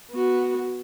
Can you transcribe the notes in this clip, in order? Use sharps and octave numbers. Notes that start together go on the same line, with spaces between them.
B3 F#4